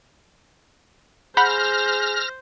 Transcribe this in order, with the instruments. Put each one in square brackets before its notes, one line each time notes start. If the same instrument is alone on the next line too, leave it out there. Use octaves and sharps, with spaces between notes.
[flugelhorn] G#4 [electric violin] C5 [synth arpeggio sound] F#5 B5 G6 [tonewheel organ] F6 A#6